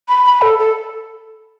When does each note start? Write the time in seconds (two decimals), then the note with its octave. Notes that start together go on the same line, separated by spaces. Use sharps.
0.09 B5
0.26 B5
0.42 A4
0.59 A4